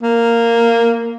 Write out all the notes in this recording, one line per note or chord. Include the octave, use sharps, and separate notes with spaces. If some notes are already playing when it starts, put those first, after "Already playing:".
A#3